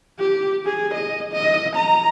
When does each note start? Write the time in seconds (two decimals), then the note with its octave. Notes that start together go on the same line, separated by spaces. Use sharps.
0.19 G4
0.66 G#4
0.94 D#5
1.33 D#5
1.76 A#5